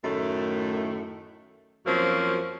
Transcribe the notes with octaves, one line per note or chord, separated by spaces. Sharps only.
F#2 A2 D#3 A3
F#2 F3 F#3 A#3 C4 C#4